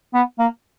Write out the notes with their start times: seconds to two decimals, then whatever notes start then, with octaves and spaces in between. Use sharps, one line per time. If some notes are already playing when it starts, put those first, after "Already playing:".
0.14 B3
0.39 A#3